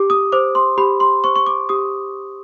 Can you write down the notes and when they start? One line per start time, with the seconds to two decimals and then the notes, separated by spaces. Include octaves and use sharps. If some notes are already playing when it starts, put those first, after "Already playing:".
Already playing: G4 D6
0.10 D#6
0.32 C5 D6
0.55 C6
0.78 G4 B5
1.00 C6
1.24 C5 C#6
1.36 C#6
1.47 D6
1.69 G4 D#6